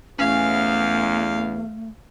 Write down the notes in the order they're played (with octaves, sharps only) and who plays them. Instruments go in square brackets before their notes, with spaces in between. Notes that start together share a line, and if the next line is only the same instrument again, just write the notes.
[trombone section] E2 [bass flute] A3 [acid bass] C#4 [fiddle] F5